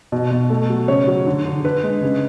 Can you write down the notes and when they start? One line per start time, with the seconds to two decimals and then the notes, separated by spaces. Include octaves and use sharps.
0.12 B2
0.31 B2
0.50 A3
0.69 F#3
0.88 C#3 C#5
1.07 F#3
1.26 D3
1.45 D3
1.64 D3 B4
1.83 G#3
2.02 C#3